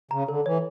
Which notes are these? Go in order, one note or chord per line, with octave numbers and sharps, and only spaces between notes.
C#3 A#5
D3 A4
E3 C#5